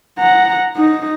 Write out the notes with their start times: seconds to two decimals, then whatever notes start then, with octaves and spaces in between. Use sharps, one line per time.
0.19 F#5 A#5
0.77 D#4